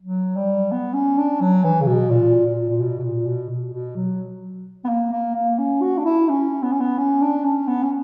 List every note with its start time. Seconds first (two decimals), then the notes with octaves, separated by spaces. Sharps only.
0.01 F#3
0.36 G3
0.72 B3
0.94 C#4
1.18 D4
1.41 F#3
1.64 E3
1.81 C#3
1.87 B2
2.11 A#2
2.46 A#2
2.69 A#2
2.81 B2
2.99 B2
3.03 A#2
3.27 B2
3.50 B2
3.73 B2
3.96 F#3
4.84 B3
4.89 A#3
5.12 A#3
5.35 A#3
5.59 C#4
5.82 F#4
5.98 D4
6.05 E4
6.29 C#4
6.63 B3
6.72 C#4
6.80 B3
6.98 C#4
7.22 D4
7.44 C#4
7.68 B3
7.83 C#4